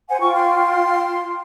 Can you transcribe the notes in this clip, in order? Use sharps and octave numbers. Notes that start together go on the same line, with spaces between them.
C5 F#5 G#5
F4 G5 C#6
C6